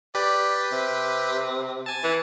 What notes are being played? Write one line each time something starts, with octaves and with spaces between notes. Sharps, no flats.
G4 B4 D5
C3
G#5 A5
E3